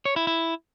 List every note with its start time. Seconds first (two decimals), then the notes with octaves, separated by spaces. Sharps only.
0.05 C#5
0.16 E4
0.27 E4